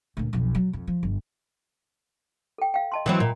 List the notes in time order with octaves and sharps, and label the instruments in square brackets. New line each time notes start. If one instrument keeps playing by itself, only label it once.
[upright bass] D2 A#2
B1 F2
F#3
F2
F3
G1
[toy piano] A4 G5
F5 G5
D#5 A5 C6
[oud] E3 F#3 C4
A#2